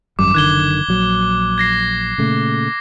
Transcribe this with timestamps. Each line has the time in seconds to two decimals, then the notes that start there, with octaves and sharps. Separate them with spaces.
0.19 G#1 F#2 G3 D6
0.34 F#1 D3 D#3 F#6 G#6 G7
0.88 A#1 F#3
1.58 G#6 A#6 C7
2.18 A#2 C#3 A3